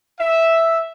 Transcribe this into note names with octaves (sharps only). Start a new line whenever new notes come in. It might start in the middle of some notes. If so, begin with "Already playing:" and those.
E5